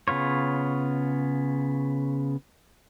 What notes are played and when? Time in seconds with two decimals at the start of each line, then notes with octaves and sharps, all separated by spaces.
0.08 C#3 B3 F4 C#5